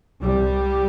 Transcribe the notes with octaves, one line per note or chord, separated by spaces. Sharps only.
C2 C3 G3